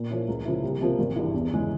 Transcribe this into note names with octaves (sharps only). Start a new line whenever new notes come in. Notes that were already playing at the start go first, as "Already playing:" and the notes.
Already playing: A#2
F3 A#3 C#4 E4
C#2
C#3 F3 A#3 E4
C2
C3 F3 A#3 F4
G#1
G2 E3
E2
C#3 E3 G#3